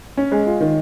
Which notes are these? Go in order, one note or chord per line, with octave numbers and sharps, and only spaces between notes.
C#4
G#3
F4
D#3